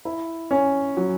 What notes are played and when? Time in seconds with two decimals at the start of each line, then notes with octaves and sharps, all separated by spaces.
0.05 E4
0.51 C#4
0.97 F#3